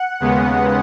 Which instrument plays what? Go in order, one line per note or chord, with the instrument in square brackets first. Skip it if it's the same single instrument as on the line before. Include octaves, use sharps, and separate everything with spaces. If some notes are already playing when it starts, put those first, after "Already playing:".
Already playing: [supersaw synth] F#5
D#2 C#3 G#3 B3